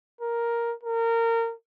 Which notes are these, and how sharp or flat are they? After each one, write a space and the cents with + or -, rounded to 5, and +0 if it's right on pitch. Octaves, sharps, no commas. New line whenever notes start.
A#4 +5
A#4 -25